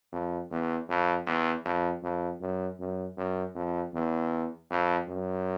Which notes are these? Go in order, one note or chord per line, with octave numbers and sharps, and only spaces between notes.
F2
E2
F2
E2
F2
F2
F#2
F#2
F#2
F2
E2
F2
F#2